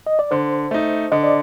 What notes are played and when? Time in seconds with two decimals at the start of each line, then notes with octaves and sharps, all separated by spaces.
0.07 D#5
0.19 D5
0.31 D3 C5
0.71 A3 D#4
1.12 D3 D#5
1.23 D5